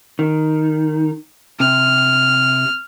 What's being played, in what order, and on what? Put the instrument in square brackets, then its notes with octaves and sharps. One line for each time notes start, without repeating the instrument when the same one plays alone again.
[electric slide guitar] D#3
[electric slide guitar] C3 [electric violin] F6